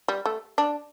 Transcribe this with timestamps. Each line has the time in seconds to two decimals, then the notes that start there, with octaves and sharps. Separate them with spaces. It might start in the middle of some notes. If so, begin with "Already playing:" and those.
0.08 G3
0.25 A3
0.58 D4